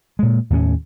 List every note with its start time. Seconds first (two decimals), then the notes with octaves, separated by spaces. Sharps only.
0.19 A#2 G#3
0.50 D#2 A2 B3 C#4